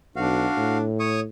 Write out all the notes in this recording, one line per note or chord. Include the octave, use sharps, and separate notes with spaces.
B1 D4 F#4 F5
A2
C#5 C#6 D#6